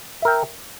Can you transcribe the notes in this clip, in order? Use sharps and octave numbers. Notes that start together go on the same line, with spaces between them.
A#4 E5 G5